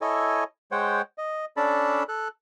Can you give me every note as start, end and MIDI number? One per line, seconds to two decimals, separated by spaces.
0.02 0.44 64
0.02 0.44 69
0.02 0.44 73
0.02 0.44 75
0.02 0.44 80
0.72 1.02 56
0.72 1.02 72
0.72 1.02 73
0.72 1.02 78
0.72 1.02 79
1.18 1.45 75
1.57 2.03 61
1.57 2.03 62
1.57 2.03 69
1.57 2.03 74
1.57 2.03 81
1.57 2.03 83
2.09 2.28 69
2.09 2.28 90